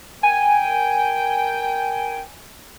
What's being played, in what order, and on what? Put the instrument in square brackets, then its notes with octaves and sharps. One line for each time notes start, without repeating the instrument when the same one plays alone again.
[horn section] A#4 G5 [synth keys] G#5